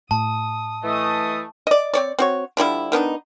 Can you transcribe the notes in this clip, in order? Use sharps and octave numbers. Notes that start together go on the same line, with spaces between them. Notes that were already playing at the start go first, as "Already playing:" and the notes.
A2 A5 D#6
E3 A3 D#5 D#6
D5 D#5
C4 C#5 D5
C4 F#4 C#5
D3 F3 G3 E4
D#3 B3 D4 D#4